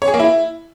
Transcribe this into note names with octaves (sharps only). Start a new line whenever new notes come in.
C#5
G#4
A#3
E4